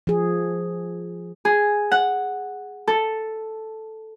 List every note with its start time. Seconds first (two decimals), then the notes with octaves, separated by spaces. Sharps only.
0.07 F3 G#4
1.45 G#4
1.91 F#5
2.88 A4